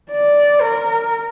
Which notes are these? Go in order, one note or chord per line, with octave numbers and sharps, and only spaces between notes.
D5
A#4